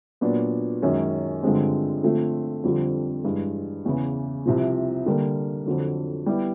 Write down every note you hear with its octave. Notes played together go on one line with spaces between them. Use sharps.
A#2 F#3 B3 D4
F#2 D#3 G#3 C#4
G2 D3 F3 G#3 C4
D3 F3 A3 C4 F4
F2 D3 G3 C4 F4
G2 E3 G#3
E2 C#3 E3
C2 C3 F3
D3 G3 A#3
F2 D3 F#3
G3 B3 E4 G4